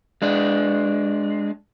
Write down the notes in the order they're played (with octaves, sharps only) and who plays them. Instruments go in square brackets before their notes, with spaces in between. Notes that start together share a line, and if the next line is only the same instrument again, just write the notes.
[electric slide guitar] G#3 D4